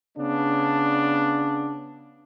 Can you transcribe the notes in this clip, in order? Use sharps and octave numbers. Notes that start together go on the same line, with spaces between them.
C#3 B3 D4